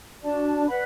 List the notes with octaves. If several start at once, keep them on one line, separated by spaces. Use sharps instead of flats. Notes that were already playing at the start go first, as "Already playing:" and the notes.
D4 F#4 D5 A5
B4 D5 F#5 B5